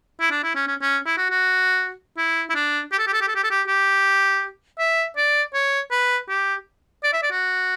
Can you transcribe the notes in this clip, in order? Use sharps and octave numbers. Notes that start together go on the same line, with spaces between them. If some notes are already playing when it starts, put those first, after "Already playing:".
E4
D4
E4
C#4
C#4
C#4
E4
F#4
F#4
E4
E4
D4
G4
A4
G4
A4
G4
A4
G4
A4
G4
G4
E5
D5
C#5
B4
G4
D5
E5
D5
F#4